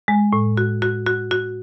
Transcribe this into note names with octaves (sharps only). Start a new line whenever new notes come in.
G#3
A2
F#4
F#4
F#4
F#4